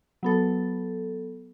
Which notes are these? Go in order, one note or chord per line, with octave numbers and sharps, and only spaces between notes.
F#3 B3 A4